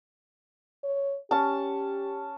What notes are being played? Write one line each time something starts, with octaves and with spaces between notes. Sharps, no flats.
C#5
C#4 G4 A5